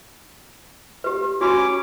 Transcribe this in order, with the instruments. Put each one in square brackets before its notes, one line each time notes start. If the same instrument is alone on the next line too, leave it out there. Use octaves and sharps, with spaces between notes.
[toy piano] G4 B4
[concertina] C#4 C#5 D6 [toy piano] F#4 B5